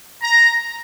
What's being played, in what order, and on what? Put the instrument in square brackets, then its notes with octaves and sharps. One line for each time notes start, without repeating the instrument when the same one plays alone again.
[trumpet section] A#5